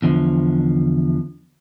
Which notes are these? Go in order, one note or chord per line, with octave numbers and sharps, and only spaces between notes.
E2 D3 F3